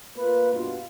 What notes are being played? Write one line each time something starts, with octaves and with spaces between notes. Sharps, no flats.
A#3 F4 B4
G2 B2 F4